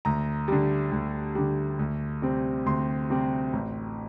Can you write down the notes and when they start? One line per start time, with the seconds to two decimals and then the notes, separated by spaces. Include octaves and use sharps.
0.05 D2 A#5
0.48 D3 G3
0.92 D2
1.35 D3 G3
1.79 D2
2.22 C3 G3 C4
2.66 D2 C6
3.10 C3 G3 C4
3.53 A1